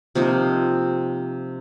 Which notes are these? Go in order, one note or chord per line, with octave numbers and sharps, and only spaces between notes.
C3 F3 A#3 D#4